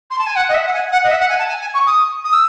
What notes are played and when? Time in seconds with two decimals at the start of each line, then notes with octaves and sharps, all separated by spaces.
0.10 C6
0.18 A5
0.26 G#5
0.35 F#5
0.48 D#5
0.54 E5
0.66 F#5
0.73 G#5
0.92 F#5
1.03 D#5
1.10 E5
1.20 F#5
1.29 G#5
1.39 A5
1.48 G#5
1.61 G#5
1.74 C#6
1.86 D#6
2.24 D#6
2.33 E6